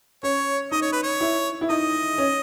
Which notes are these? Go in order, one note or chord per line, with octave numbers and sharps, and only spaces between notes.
C#4 C#5
D#4 D#5
C#5
B4
C#5
E4
E4
D#4 D#5
C#4